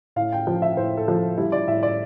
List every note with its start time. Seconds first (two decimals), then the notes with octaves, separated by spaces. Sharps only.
0.16 A2 F5
0.32 G5
0.47 F3
0.62 E5
0.77 A2 C5
0.97 A4
1.08 F3
1.38 G3 E4
1.52 D5
1.68 A2 E5
1.83 D5